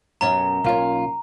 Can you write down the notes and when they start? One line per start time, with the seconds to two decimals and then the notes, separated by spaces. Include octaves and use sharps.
0.21 F#2 B2 C#4 A#5
0.64 B1 A#3 C#4 F4